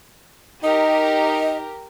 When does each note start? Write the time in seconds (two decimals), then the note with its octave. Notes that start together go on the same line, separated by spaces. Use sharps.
0.63 D#4 G4 A#4 D#5